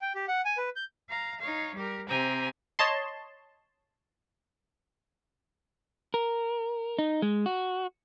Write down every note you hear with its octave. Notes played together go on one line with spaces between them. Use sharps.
G5
G4
F#5
G#5
B4
G6
F5 A#5
D#4 C#5 F5
G3 G4 A#4
C3 C4 G4 G5 G#5 A#5
C#5 D#5 A5 C6
A#4
D#4
G#3
F#4